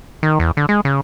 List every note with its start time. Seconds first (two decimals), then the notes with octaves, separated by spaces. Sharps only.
0.23 D#3
0.40 E2
0.57 D3
0.69 G#3
0.85 C#3